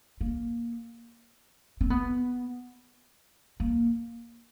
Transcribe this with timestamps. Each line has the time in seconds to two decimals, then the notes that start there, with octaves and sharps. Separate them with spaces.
0.21 A#3
1.81 C4
1.90 B3
3.60 A#3